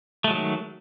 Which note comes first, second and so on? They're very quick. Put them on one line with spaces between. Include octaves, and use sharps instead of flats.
A3 G#3 F#3 D#3